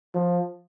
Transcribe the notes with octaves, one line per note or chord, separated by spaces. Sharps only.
F3